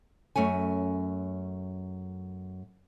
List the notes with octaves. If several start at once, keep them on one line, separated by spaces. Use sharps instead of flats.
F#2 A3 C#4 G#5